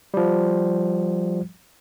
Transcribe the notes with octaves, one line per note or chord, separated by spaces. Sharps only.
F3 G3